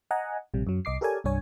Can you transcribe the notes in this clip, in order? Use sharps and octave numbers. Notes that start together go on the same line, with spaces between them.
D#5 F#5 G#5 A#5
A#1 C3 G3
F#2 F#3
C2 D#5 D6 C7
G4 A4 A#4 C#5 D5 G#5
C2 G2 D4 C#5 G#5